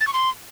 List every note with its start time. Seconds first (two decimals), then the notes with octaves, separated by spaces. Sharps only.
0.01 A6
0.07 C#6
0.14 C6